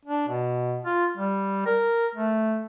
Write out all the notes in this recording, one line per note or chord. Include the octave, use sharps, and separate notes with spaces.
D4
B2
F4
G3
A#4
A3